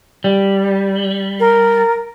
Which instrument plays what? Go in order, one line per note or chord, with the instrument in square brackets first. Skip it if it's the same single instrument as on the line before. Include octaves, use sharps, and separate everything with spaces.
[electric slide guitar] G3
[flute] A#4